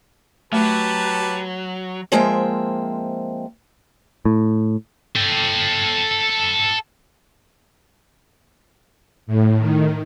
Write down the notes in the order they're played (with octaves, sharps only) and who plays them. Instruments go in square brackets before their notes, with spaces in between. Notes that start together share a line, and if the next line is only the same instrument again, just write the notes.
[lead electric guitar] F#3 [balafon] A3 [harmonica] G4 B4 A5
[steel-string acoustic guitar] F3 G#3 A#3 C4 E5 G5
[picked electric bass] A2
[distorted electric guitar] A4 G5
[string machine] A2
D#3